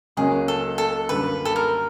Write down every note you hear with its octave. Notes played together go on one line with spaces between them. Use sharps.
C#2 C#3 F#3 A#3 C#4 G#4
A4
A4
F#2 D3 G3 A#3 B4
A4
A#4